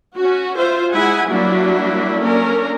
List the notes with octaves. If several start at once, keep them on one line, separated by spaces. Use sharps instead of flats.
C#4 F#4
F4 C5 E5
G#3 E4 G#4 F#5 G#5
F#3 G3 A#3 D4 E4 F#4
A#3 C#4 D4 A4 A#4